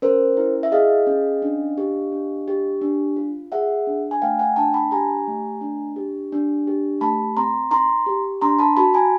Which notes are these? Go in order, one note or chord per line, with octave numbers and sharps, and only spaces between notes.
C#4 A#4 C5
E4
E5
G#4 D#5 F5
C#4
D4
G4
D4
G4
D4
F4
G#4 E5 F#5
D4
G#5
A3 F5 G5
F#5 G#5
D4 G5 A5
A5 B5
G4 G#5 A#5
A3
D4
G4
D4
G4
A3 A5 B5
C4 A#5 C6
D#4 A#5 C6
G4
D4 A#5 C6
A5 B5
F#4 A5 B5
G#5 A#5